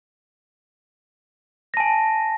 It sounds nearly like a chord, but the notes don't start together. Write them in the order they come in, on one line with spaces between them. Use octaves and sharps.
A#6 A5 G#5